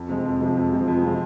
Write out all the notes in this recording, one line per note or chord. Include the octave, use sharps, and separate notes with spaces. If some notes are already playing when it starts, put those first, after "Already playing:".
Already playing: F2
C3 F3 G#3
F2
C3 F3 G#3
F2
C3 F3 G#3
F2
C3 F3 G#3